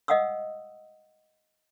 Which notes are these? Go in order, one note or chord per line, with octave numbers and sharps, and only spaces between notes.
D#5 F5 F#5 D#6 E6